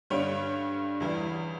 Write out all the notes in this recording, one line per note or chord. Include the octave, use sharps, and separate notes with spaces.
G2 D3 G3 C#5
E2 E3 G3